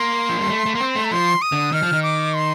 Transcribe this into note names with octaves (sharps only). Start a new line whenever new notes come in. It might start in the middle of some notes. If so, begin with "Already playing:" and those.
Already playing: A#3 C6
F3
G3
A3
A3
A#3
C4
A3
A#5
F3 C6
D#6
D3
D#3 F6
F3
D#3
D6
C6